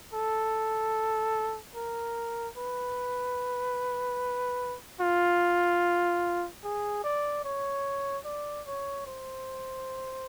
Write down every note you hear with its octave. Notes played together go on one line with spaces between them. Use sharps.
A4
A#4
B4
F4
G#4
D5
C#5
D5
C#5
C5